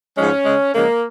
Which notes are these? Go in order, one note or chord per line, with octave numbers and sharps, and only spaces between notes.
G#2 F3 G#3 C#4
C#3 G#3
C#3 F3 G#3 A#3